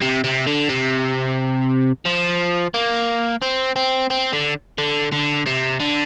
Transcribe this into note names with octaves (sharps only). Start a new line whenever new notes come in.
C3
C3
D3
C3
F3
A#3
C4
C4
C4
D3
D3
D3
C3
D3